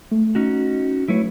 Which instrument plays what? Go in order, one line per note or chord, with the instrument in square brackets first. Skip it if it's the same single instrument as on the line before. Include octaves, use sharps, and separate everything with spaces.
[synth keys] A3
[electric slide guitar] C#4 D#4 F#4
[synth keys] F#3 A3 [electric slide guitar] E4 B4 C#5